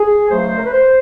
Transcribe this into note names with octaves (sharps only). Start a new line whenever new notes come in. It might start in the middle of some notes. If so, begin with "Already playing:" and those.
Already playing: G#4
C#2 C#3 F#3 A3 C5
A#4
B4
C5